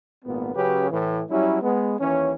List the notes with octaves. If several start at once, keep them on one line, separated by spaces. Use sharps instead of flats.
G#1 A#2 B3
C#3 F#3 C#4 G4 B4
A2 E3
F#3 G3 C#4 E4
G#3 B3
D#2 E3 C#4